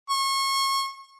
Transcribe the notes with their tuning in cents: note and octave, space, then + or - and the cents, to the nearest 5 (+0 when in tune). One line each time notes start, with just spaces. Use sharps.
C#6 -30